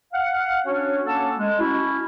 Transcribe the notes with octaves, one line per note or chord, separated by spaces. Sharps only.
F5 F#5
C#4 D4 F#4 C#5
A#3 C#4 A4 C#5 F#5 A5
G#3
C#4 E4 F#4